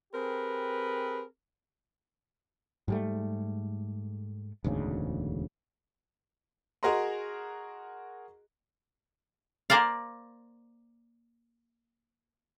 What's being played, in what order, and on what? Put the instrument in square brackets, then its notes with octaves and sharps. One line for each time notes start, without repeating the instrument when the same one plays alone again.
[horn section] C4 G4 G#4 A#4 B4
[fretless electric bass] G#2 G3 A3
E1 D2 G#2 C#3
[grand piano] F#4 G#4 A#4 D#5 A#5 C6
[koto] A#3 A#4 C5 D5 F5